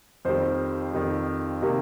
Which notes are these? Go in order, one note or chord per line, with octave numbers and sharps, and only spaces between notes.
F2 D#3 G3 C5
F2 D#3 G3
C3 D#3 G3 A#3